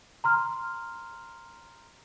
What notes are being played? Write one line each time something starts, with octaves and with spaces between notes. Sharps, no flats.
A#5 C6 F6